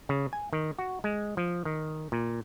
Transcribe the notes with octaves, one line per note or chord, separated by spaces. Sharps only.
C#3
G#5
D#3
F#4
G#3
F3
D#3
A#2